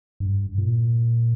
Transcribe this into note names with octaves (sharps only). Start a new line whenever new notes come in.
G2
A#2